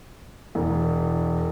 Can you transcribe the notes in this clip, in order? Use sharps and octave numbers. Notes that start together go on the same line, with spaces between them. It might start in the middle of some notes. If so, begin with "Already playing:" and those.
E1